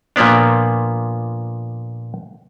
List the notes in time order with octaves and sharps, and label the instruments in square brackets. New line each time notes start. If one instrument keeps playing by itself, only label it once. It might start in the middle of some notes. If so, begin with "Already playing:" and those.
[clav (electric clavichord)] A#2 F3 A#3 B3 D4